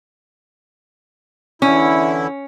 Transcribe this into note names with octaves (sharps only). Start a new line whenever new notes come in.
E2 D3 C#4 E4